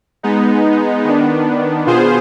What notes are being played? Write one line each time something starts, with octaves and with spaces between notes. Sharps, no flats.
G#3 B3 D#4
D#3 B3 D4
B2 B3 F4 G#4 C5